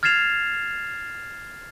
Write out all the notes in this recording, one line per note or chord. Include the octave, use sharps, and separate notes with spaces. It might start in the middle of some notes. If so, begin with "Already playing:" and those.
F6 G#6 A6 C7 E7 F7